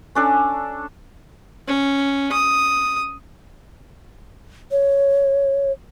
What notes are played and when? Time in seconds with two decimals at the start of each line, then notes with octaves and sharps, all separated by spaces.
0.15 C#4 D4 A4
1.67 C#4
2.32 D#6
4.72 C#5